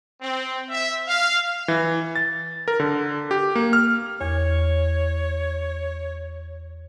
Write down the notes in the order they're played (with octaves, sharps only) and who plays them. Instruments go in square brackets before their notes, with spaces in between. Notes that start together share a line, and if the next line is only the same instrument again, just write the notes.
[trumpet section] C4
E5
F5
[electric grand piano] E3
A6
A#4
D3
G4
A#3
F6
[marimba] E2 [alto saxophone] C#5